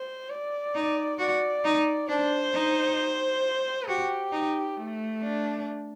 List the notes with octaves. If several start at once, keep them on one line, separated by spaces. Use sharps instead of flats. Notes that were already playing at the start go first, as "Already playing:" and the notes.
Already playing: C5
D5
D#4
F#4 D5
D#4
D4 C5
D#4
F#4 G4
D#4
A3
D4